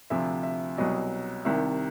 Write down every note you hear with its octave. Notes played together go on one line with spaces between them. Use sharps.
D2 C3 F3 E5
E5
C2 B2 F#3 D#5
C2 C3 D#3 E5